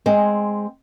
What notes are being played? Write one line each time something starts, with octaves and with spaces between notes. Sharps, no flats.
G#3 C4